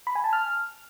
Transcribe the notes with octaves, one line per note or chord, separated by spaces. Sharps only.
B5
G#5
A5
F6